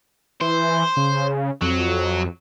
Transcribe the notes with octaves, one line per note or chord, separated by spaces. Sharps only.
E3 C5
C#3
F2 F#3